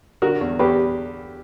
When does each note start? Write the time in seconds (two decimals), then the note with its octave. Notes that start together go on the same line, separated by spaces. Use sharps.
0.22 D3 F#4 A#4
0.41 E2
0.59 E2 G4 B4